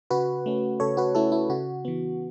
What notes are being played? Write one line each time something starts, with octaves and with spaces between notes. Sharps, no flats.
C#3 F#4 B4
A3 C#4
C#3 A4 C#5
F#4 B4
A3 C#4 E4 A4
E4
C#3 F#4
E3 B3